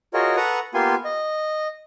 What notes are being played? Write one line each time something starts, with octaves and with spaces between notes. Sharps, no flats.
F4 F#4 G#4 A#4 C#5 D#5
A4 B4 F#5 A#5 C#6 D#6
A#3 B3 F4 G4 G#5 C6
D#5